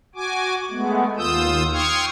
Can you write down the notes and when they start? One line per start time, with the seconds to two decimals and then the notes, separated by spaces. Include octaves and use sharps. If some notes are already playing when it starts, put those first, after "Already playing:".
0.15 F#4 G#5 D6
0.71 G#3 A3 B3
1.18 D#2 F4 D#6 E6 G6
1.73 G5 C6 C#6 D#6 F6 G#6